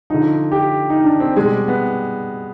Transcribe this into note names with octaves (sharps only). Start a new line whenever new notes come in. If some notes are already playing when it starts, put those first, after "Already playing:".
D3 F3 D#4
G4
D#4
D4
C4
B2 G3 G#3
B3